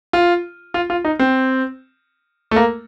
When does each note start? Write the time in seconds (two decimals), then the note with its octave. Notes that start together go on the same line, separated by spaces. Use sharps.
0.13 F4
0.74 F4
0.90 F4
1.05 D#4
1.19 C4
2.51 A3
2.56 A#3